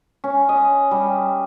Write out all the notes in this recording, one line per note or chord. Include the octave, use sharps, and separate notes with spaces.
C#4
D#5
G3